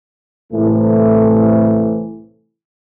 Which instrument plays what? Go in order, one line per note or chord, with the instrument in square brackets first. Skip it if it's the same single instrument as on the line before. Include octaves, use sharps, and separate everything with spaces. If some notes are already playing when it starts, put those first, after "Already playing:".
[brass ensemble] C2 A2 C3 E3 A3